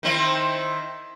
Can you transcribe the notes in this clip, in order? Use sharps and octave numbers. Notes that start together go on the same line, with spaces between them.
D#3 C4 E4